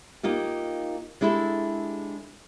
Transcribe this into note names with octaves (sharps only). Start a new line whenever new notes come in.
A#3 D#4 F4 G4
G#3 D4 E4 G4 A4